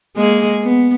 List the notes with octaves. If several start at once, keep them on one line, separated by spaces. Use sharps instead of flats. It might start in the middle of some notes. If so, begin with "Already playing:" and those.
G#3 A#3 G#4
B3